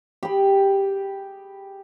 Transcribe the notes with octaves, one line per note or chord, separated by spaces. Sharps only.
G4 G#4 B5